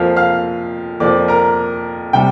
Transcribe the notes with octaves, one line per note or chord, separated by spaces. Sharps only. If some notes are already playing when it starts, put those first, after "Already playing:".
Already playing: F2 F3 A#3 F5 F6
F5 F6
F2 F3 A#3 D5 D6
A#4 A#5
C3 G3 G5